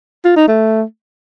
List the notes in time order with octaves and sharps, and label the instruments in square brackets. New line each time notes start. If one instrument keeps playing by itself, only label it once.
[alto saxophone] F4
D#4
A3